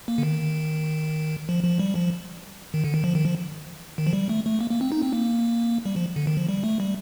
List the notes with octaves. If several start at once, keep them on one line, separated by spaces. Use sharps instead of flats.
A#3
D3
D#3
F3
F3
G3
F3
D#3
D3
D#3
F3
D#3
F3
D#3
F3
G3
A3
A3
A#3
A#3
C4
D#4
C4
A#3
G3
F3
D3
D#3
F3
G3
A3
G3